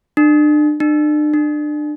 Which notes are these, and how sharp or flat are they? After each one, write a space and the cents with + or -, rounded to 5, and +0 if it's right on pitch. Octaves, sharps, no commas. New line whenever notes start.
D4 +35
D4 +40
D4 +30